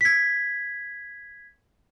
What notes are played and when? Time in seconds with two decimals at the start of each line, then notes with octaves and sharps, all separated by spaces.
0.01 G#6 B6